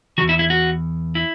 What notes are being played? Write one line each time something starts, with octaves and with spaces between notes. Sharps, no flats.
D#3 F#4
E2
E4
E4
F#4
E4